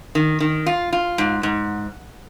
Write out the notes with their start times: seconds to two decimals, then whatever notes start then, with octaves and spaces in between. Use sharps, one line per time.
0.15 D#3
0.40 D#3
0.66 F4
0.92 F4
1.18 G#2
1.43 G#2